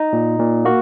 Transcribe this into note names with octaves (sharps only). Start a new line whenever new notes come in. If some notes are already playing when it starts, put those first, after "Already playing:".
Already playing: D#4
A#2
A#2
A#3 F#4